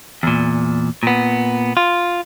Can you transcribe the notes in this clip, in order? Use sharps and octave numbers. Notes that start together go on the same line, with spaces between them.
E2 A#2
A#2 B3
F4